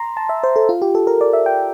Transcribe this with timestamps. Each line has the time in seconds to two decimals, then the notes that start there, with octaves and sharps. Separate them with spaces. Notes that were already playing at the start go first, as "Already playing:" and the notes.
Already playing: A#5 C6
0.17 A5
0.29 E5
0.43 C5
0.56 A4
0.69 F4
0.82 G4
0.95 A4
1.07 A#4
1.21 D5
1.33 E5
1.46 G5